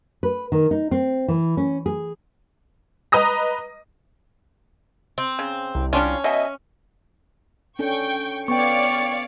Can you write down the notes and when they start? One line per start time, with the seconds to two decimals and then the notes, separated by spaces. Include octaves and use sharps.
0.23 B4
0.52 D#3
0.71 D#4
0.91 C4
1.28 E3
1.57 C#4
1.86 G#4
3.12 B4 D#5 A#5 D#6 A#6
5.18 C4
5.39 C#3
5.75 C2
5.93 G3 C#4 D4 F4
6.24 B2 D#5 E5 G#5
7.79 C#4 D4 A4 G5 C#6
8.48 B3 C#5 D5 F5 G5 C#6 C#7